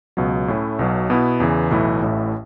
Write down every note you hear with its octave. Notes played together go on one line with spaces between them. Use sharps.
C#2 B2 F#3
A2 A3 C#4 E4
B1 B2 F#3
B2 B3 E4
E2 C#3 E3
B1 A2 E3 A3 E4
A1 A2 A3 E4